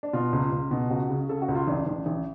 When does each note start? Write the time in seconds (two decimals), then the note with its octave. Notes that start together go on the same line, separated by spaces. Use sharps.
0.03 D4
0.13 B2 F4
0.33 C#2
0.52 C#2
0.71 B2
0.91 C#2 F#4
1.10 C#3
1.29 C#3 A4
1.42 F#4
1.48 C#2
1.55 F4
1.68 A1 D4
1.87 A1
2.06 A1